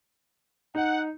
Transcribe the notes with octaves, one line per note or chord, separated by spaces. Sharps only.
D#4 F#5